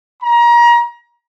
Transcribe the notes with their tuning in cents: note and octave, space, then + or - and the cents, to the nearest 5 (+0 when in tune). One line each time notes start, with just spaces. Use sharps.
A#5 +30